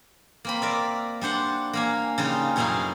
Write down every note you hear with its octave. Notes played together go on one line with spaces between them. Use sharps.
A#3 C4 B5
A#4 D5 E5
G3 D4 C5 F#5
A#3 F5 G#5
C#3 G3 D#4 F4
F#2 B2 A3 E4 G#4 F5